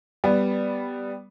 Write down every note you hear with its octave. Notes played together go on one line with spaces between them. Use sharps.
G3 B3